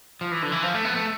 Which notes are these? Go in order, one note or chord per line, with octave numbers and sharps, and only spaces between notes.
F3
E3
D3
E3
F3
A3
B3
A3